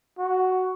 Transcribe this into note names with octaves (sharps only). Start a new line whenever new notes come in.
F#4